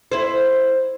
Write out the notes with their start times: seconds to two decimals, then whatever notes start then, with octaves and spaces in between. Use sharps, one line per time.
0.12 E4 C5